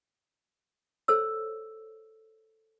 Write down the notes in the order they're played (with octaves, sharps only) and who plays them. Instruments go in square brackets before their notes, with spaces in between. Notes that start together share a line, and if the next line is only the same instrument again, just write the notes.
[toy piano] A4 C5 C#5 E6